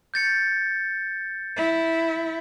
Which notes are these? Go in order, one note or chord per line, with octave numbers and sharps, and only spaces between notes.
G6 A6 C#7
E4